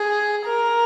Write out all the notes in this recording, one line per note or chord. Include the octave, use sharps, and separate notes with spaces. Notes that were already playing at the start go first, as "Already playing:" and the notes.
Already playing: G#4
A#4